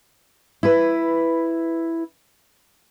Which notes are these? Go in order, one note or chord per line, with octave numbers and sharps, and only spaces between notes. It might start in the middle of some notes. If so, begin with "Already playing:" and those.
E4 B4